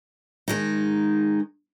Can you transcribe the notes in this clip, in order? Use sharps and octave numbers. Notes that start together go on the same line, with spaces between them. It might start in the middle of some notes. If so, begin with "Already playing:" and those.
D#3 G#3 D#4